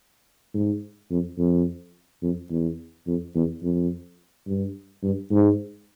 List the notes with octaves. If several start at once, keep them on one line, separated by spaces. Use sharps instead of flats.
G#2
F2
F2
F2
E2
F2
E2
F2
G2
G2
G#2